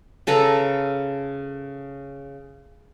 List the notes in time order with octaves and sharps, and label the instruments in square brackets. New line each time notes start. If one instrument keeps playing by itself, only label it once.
[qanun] C#3 A4 B4 A#5